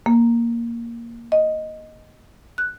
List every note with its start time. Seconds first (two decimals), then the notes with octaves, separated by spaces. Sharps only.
0.06 A#3
1.32 D#5
2.58 F#6